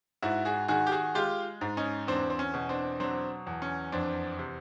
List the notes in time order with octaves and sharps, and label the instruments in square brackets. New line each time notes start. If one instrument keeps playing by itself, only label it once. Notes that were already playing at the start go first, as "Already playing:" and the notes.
[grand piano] G#2 E4 F#4
F#4 G#4
D#3 F#4 G#4
G4
F#4 G#4
G#3 F4 G4
G#2
C#4 D#4
E2 C4 D4
C4
C#4
B2
C4 D4
F#3 C4 D4
E2
C#4
F2 C4 D4
C3